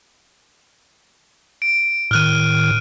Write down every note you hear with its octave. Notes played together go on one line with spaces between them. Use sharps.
D7
A2 D#3 F6 F#6 D#7